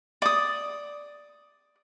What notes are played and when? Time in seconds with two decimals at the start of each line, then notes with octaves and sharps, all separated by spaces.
0.22 D5 D#6